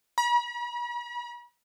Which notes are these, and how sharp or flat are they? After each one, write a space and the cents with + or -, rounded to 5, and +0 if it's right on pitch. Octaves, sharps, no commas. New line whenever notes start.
B5 -45